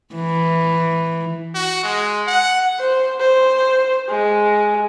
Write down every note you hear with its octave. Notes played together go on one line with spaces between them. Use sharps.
E3
F#4
G#3
F#5
C5
C5
G#3